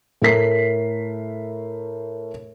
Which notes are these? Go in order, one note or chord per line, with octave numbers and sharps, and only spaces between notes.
A2 A3 A#4 B6 C7